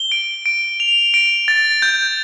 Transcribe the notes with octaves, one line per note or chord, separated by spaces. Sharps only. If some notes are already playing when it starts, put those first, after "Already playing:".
Already playing: G7
D7
D7
F7
D7
A6
G6